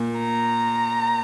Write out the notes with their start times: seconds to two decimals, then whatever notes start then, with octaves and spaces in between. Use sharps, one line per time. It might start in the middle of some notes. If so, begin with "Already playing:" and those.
Already playing: A#2
0.18 A#5